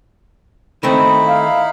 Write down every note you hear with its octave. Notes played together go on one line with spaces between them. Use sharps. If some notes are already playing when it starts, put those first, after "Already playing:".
D#3 A3 C4 D#4 E4 B5
F5